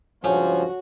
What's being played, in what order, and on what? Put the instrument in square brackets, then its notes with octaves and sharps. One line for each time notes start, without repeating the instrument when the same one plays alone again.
[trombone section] C#2 G2 F3 [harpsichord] C#4 [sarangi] F#4 [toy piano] A4 C#5 A5